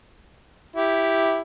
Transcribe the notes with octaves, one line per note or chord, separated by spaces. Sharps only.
E4 G4